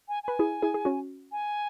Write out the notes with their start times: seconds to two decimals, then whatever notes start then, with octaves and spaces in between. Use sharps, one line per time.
0.08 G#5
0.23 B4 G#5
0.39 E4 G#4
0.62 E4 G#4
0.74 G#4
0.85 C#4 F#4
1.32 G#5